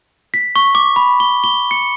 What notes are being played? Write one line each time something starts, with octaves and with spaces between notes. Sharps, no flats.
B6
C#6
D6
B5
G7
G7
C#7